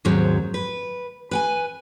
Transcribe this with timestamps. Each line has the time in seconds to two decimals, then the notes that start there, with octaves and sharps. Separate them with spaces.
0.05 D#2 G#2 F#3 C4
0.54 B4
1.31 B4 G5 G#5